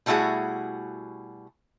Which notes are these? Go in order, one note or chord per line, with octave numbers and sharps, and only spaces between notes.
B2 G3 A3 E4 F#4 G#4